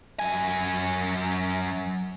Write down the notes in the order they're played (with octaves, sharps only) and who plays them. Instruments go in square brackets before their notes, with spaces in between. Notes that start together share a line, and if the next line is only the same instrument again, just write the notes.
[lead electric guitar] F#2 G#5